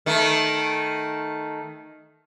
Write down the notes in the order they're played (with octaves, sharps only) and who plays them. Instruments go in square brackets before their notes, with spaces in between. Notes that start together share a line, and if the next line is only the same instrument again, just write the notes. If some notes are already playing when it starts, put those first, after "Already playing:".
[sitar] D#3 A3